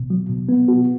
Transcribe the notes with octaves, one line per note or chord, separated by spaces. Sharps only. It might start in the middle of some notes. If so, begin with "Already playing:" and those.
Already playing: B2
F#3
B2
B3
F#4